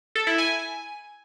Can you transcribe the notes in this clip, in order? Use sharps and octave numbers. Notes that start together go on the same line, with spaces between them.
A4
E4
G#5